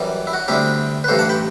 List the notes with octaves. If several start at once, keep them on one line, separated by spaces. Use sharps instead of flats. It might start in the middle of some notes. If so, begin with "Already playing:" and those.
Already playing: F#2 E3 G3
E4
F#4
D2 C3 G3 D4 E4 G4
B4
A1 G2 E3 A4 C5
F#5 A5
G5 B5